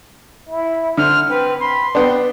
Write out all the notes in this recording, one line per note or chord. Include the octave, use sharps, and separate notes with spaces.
E4
D3 C5 F6
C4 B4
B5 C6
B3 C4 D4